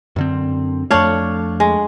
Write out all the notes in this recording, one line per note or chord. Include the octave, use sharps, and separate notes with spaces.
F#2 D3 C4
F2 A3 D4 C#5 F5
G#3